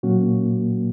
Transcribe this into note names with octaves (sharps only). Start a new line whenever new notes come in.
A#2 F#3 A#3 C#4 F#4